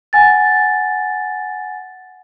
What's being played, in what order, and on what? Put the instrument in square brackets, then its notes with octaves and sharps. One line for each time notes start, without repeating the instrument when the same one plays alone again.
[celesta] F#5 G#5 A6